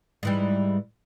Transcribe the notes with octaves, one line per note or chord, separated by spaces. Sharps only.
G#2 E3 G3